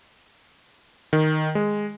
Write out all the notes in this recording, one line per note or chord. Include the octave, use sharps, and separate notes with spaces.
D#3
G#3